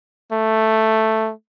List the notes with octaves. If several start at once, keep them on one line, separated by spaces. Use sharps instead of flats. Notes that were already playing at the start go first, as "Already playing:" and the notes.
A3